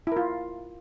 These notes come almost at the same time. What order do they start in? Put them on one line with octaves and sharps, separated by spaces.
E4 A#4 F4